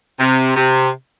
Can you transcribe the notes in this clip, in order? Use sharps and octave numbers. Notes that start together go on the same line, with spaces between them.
C3
C3